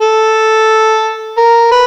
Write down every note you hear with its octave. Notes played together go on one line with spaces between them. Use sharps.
A4
A#4
B4